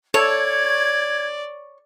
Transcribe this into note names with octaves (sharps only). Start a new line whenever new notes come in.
A4 C#5 D5 G#6